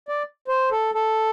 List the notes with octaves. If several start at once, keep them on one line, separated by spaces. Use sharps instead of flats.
D5
C5
A4
A4